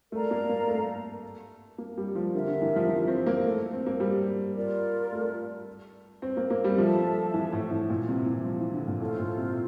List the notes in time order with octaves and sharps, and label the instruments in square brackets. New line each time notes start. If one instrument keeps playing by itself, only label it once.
[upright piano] A3 [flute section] A#4 D5 F5 A#5
[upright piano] A#3
A#3
A3
A#3
G3
F3
[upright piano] D3 [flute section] G4 A#4 E5
[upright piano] D3
E3
F3
F3
C4
A#3
A3
C4
A#3
G3
[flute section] F4 A#4 D5
[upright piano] A3
C4
A#3
A#3
G3
[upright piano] F3 [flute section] A4 E5 A5
[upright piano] E3
A2
A2
A#2
C3
E3
F3
E3
D3
A#2
[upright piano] A2 [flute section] F4 A4 C5
[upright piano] A#2
C3